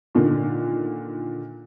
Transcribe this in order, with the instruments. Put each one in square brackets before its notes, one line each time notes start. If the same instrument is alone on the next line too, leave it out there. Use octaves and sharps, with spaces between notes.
[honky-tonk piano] A#2 D3 D#3